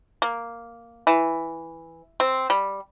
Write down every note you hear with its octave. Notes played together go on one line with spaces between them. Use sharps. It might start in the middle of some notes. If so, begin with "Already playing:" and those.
A#3
E3
C4
G3